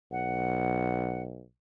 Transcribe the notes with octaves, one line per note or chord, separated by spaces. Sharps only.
B1 F#5